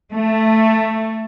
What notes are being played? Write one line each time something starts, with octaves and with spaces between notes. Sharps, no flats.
A3